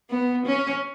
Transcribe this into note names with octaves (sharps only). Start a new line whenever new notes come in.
B3
C#4